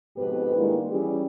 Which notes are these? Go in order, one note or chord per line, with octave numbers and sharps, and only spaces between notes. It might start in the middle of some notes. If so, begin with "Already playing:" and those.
F2 G#2 B2 G4 B4
D#3 G3 G#3 A#3 D4 E4
E3 G3 C#4 G4 G#4